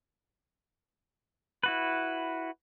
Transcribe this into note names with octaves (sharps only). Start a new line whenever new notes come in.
E4 F#4 B4